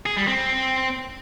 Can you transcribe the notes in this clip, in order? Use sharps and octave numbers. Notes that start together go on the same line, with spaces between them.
G#4
G3
C4